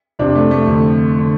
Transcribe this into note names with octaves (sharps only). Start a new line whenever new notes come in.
F2 C3 D4
A3
A3
F2 D3
D3